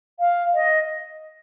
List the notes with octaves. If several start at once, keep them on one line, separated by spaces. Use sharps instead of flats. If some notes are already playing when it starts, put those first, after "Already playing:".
F5
D#5